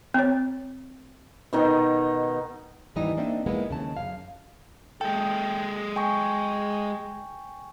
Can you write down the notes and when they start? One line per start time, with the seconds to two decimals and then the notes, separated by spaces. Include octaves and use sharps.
0.14 C4 C#5
1.53 B2 D#3 D#4
2.95 D#2 G#2 E3 G3 D#4 D#5
3.17 A#3 C4 D4 D#4 E5 G5
3.46 F3 G#3 A#3 B3 D#4 E4
3.69 D#2 C#3 A5
3.97 F#2 F5
5.01 G#3 A4 G5
5.96 G5 G#5 C#6